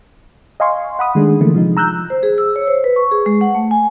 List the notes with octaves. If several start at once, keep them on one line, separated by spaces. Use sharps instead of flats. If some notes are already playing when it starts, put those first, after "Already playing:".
D#5 F5 G#5 C6 C#6
F#5 B5 D#6
D#3 G#3 A3 D4
D3 E3 F3 A3 A#3
C3 F3 G#3 D#4
A#5 E6 F#6 G6
C5
G#4
E6
C#5
C5
B4
C#6
G#4
G#3
F#5
A3
G#5